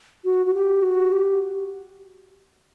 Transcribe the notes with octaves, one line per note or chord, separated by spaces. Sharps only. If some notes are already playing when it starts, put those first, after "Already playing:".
F#4
F#4
G4
F#4
G4